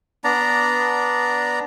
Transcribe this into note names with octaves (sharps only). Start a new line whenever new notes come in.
B3 D4 D5 A#5